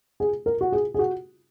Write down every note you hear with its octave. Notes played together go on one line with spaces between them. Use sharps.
G#4
A#4
F#4
G#4
G#4
F#4